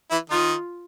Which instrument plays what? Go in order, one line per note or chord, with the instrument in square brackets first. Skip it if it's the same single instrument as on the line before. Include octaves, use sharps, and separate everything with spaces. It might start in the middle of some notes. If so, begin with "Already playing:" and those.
[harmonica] E3 E4
[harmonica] D#3 D#4 [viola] F4